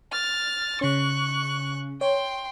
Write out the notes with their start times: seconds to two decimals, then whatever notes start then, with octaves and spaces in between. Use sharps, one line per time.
0.12 F6 A6
0.81 C#3 C#4 C#6 F#6
2.01 C#5 G5 C6